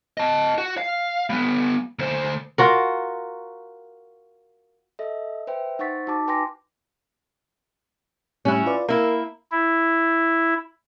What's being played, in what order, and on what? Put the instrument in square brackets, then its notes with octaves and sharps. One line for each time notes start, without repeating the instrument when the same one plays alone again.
[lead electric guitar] D#5 A5
F#4
F5
G3 B3
D2 C5
[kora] F4 F#4 A#4
[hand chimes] A4 D#5 E5
B4 C5 E5 G5
D#4 C5 F#5 C#6 A6 B6
D#4 F#4 A5 D6
B4 G5 G#5 C6 D6 A#6
[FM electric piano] A2 G3 F#6 [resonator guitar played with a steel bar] C#4 E4
[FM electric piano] F4 B4 D5
[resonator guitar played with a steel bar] A#3 E4 [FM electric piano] A#4
[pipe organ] E4